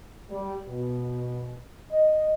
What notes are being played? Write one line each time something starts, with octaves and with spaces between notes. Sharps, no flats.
G3
B2
D#5